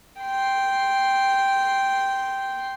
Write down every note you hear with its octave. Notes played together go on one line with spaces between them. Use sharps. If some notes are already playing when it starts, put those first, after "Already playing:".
G5 C6